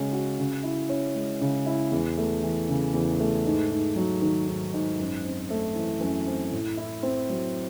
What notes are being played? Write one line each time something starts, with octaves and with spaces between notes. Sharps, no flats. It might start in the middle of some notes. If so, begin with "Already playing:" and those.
Already playing: C#3 G#3 C#4 F#4
F#4
C#3
E4
C#4
G#3
C#3
E4
E2
A3
E3
C#3
E2
A3
G#2
G#2
F#3
D#3
G#2
G#2
F#2
C4
A3
E3
F#2
C4
A2
E4
C4
F#3